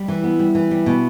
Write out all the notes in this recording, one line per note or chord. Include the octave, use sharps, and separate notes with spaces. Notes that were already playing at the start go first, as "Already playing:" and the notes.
Already playing: G3
E3
B3
G3
E3
G3
B2